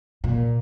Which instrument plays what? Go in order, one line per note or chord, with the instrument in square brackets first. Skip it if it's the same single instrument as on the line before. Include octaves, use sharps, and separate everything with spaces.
[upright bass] A#2